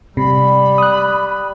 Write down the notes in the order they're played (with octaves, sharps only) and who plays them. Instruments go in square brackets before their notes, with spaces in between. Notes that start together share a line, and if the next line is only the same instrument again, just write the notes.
[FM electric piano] C3 [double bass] G3 [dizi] B5
[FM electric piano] D#6 F#6